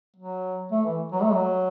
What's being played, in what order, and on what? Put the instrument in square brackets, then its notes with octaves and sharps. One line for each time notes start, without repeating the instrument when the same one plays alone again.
[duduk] F#3
A3
E3
F#3
A3
F#3